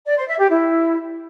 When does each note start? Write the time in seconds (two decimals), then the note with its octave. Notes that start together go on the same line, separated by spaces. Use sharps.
0.06 D5
0.17 C5
0.28 E5
0.39 G4
0.50 E4